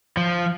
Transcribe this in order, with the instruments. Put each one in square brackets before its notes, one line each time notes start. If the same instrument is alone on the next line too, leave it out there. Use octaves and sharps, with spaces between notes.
[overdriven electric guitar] F3